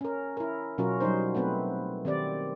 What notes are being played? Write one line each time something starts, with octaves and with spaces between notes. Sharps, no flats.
C#4 A#4
E4 A#4
B2 F#3 C#4 F4 F#4 A#4
F#3 G3 D#4 C5
A3 B3 C4 B4
D#3 C4 G4 D5